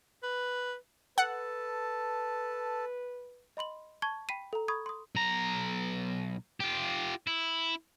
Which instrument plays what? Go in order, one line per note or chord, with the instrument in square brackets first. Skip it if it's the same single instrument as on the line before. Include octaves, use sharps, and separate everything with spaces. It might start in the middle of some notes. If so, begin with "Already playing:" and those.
[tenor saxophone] B4
[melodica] A4 A5 [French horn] B4 [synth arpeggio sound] F#5
[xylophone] D#5 B5 C6 F#7
A5 C#6 G#6 G7
G5 B5 B6 C7 D#7
A4 A#5
B5 C#6 D#6 G#6
C6 D#6
[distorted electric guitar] B1 A#5
F4 G4
E4